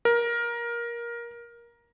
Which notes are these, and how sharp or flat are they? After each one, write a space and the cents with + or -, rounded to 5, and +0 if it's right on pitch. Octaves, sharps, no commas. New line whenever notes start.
A#4 +15